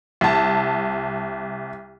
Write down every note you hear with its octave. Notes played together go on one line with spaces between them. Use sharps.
C2 A5